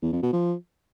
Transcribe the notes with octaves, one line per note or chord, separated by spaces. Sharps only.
E2
F2
B2
F3